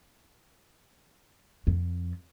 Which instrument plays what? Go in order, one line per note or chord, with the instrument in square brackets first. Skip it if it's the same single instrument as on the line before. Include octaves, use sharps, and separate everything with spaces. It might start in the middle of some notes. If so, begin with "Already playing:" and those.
[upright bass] F2